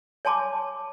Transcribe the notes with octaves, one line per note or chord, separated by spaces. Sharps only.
C#5 G#5 A5 C6 D6